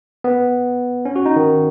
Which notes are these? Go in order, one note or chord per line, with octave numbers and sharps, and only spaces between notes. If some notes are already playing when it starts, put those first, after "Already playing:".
B3
C#4
F#4
D#4
D#3